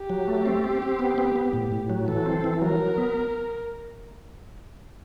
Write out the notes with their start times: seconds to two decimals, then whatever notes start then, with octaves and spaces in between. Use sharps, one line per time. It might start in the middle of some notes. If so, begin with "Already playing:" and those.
Already playing: G4
0.10 F#3
0.28 A3
0.46 C4
0.64 C4
0.82 C4
0.99 B3
1.18 B3
1.36 B3
1.53 A2
1.72 A2
1.90 F#3
2.07 E3 A4
2.26 C4
2.44 E3
2.62 F#3 A#4
2.80 F#3
2.98 B3